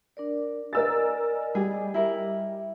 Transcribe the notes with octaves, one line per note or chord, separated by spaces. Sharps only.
D4 A#4 D5
A#4 D5 D#5 G#5 E6 A6
G3 G4 G#4
E4 A#4